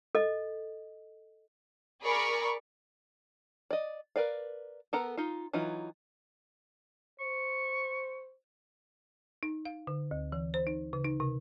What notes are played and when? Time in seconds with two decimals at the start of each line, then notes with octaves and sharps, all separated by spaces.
0.15 A4 D#5
2.03 G#4 A#4 D5 B5 C#6
3.71 D5 D#5
4.16 A#4 B4 D5 F5
4.93 B3 A4 A#4 A#5
5.17 D#4 F4
5.53 E3 F#3 D#4 F4
7.20 C5 C#6
9.43 D#4
9.65 F5
9.87 D3
10.11 D2
10.32 E3
10.54 C5
10.67 D#4
10.93 C#3
11.05 D#4
11.20 C3